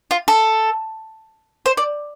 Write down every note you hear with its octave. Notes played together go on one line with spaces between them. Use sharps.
F4
A4
C5
D5